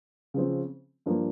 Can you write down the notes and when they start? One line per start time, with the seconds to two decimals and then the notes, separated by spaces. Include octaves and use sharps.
0.34 C#3 F3 C4
1.06 G2 F3 A#3